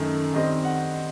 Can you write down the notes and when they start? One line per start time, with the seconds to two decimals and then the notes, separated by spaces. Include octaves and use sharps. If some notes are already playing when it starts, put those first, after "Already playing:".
Already playing: F#2 D#3 A3
0.34 D#3 G3 C4 D#5
0.65 F#5